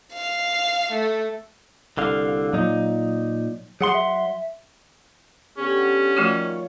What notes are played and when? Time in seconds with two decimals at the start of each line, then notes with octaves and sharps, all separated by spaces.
0.14 F5
0.92 A3
1.97 C2 D3 F5
2.54 A#2 F#3 D#4
3.81 F#3 G#4 F#5 C6
3.94 E5
5.57 D3 B3 C#4 G4
6.17 D#3 F3 A3 F4 F#4 C#5